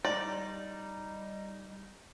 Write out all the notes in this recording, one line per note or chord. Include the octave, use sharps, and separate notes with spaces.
G3 D#4 D5